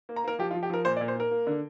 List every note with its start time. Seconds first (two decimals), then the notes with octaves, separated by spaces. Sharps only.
0.09 A#3
0.16 A#5
0.24 A#3 A#4
0.39 F3 G4
0.51 F4
0.55 F3
0.63 G4
0.70 F3 A#4
0.85 A#2 C5
0.96 D5
1.01 A#2
1.08 C5
1.16 A#3 A#4
1.31 A#3
1.47 D3